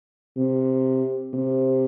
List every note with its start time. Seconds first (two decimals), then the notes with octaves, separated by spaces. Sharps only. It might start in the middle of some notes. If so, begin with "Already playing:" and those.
0.37 C3
1.34 C3